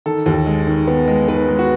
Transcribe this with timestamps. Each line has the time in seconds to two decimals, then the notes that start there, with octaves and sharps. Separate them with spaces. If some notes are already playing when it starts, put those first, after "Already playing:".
0.06 D#3 A4
0.26 D#2
0.46 G#3
0.67 D#3
0.87 B3
1.08 G#3
1.28 D#3 B4
1.48 G#3
1.59 F#4